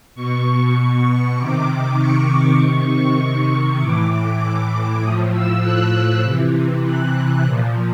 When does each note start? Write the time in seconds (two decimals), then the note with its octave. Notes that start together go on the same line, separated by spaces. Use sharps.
0.15 B2 C#6
1.37 C3 D#3 D6
1.98 C#6
2.59 C3 D#3 C#6
3.80 A2 E3 D6
4.41 D6
5.01 A2 F3 D#6
5.32 E6
5.62 F#6
6.23 C3 E3
6.84 F#6
7.44 A#2 F3